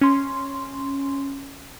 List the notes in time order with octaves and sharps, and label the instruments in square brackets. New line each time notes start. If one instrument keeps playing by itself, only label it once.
[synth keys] C#4 C6